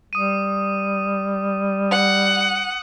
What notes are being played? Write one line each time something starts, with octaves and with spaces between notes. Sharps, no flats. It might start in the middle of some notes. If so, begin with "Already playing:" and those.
G3 D#6 D#7
F#5